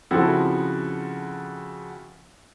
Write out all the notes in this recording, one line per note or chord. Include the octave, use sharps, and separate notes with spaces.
C#3 F3 C4 E4 F#4 A4